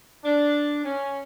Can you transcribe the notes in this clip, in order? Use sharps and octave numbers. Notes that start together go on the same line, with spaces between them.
D4
C#4